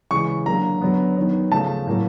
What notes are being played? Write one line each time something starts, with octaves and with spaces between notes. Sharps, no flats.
C#3 E3 G#3 C#6
D3 F#3 A#3 A#5
D3 F#3 B3
D#3 F#3 B3
C#3 F3 A3 A5
A2 F#3 A#3